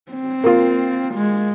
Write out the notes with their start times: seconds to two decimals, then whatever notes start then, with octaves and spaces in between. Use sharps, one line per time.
0.12 C4
0.44 A#3 F4
1.14 G#3